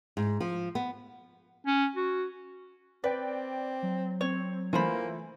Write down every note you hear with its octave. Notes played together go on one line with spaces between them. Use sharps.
G#2
F3
B3
C#4
F#4
C4 B4 D5 G5
F#3
C4 C#5
E3 A3 A#3 F4 C5 G#5 B5